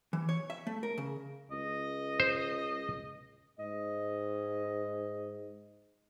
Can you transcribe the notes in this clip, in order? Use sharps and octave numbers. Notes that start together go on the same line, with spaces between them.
E3
C#5
E5
A3
A#4
C#3
C#2 D#5
C5
G#2 D#5